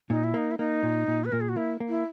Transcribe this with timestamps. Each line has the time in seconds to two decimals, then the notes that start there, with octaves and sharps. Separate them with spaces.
0.10 A#2 D#4
0.24 E4
0.34 A#3 D#4
0.51 E4
0.58 A#3 D#4
0.83 A#2
1.08 A#2
1.25 B4
1.32 A#2 A#4
1.41 G#4
1.49 F#4
1.57 A#3 E4
1.80 A#3
1.89 E4